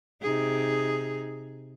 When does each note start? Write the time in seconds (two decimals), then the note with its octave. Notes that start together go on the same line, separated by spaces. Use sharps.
0.22 C3 D#4 G#4